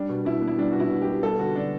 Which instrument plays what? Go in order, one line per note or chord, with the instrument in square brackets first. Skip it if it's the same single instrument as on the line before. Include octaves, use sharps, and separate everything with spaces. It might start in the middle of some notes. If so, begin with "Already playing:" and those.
Already playing: [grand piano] G3 D4
B2
B2 E4
B3
E4
G3 D4
B2 F#4
E4
B2
G4
B3
G3 A4
D3 F#4
D3 D4